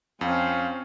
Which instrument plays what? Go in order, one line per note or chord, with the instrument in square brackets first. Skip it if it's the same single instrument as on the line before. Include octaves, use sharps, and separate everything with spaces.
[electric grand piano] F2 [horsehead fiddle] C4 [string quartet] C#4 [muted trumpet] F5